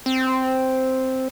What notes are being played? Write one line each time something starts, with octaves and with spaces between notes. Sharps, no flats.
C4